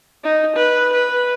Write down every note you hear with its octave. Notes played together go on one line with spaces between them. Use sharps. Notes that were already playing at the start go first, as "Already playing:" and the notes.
D#4
B4
B4